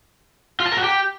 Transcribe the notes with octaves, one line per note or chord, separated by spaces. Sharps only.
F4
A5
A#4
F#4
G4